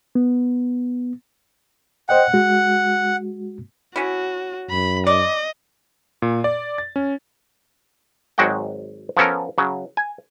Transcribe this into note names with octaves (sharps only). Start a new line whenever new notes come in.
B3
C5 D#5 F#5 G5
G#3 F#4
C#4 E4 F#4
F#2 B5
D5 D#5
A#2
D5
A6
C#4
G#1 F#3 G#3 F#4 F#5 G5
F3 B3 C#4 A4 A#4
C#3 F#3
G#5